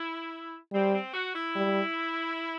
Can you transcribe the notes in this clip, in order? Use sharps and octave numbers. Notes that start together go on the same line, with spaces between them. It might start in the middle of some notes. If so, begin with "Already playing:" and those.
Already playing: E4
G3 C4
C4
F#4
E4
G3